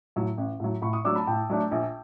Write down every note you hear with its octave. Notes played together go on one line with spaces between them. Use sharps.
A2 F#3
A1
A2 F#3
A2 B5 C#6
C#6 D#6
F#3 A3 D4 D6 E6
A5 B5
A2 G5 A5
F#3 A3 D4
A#1